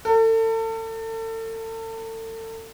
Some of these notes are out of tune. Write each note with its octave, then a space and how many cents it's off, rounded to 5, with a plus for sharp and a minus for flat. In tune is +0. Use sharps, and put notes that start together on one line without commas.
A4 +35